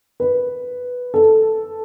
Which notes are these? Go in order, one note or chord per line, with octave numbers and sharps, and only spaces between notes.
B4
A4